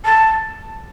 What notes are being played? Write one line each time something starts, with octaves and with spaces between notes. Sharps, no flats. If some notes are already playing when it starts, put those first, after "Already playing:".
A5